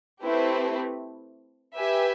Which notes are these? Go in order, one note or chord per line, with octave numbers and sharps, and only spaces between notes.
A3 C4 E4 G4 B4
G4 B4 E5 G#5